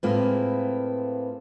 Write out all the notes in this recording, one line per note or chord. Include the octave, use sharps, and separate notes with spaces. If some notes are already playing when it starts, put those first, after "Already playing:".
A2 G#3 A#3 C4 F4 B4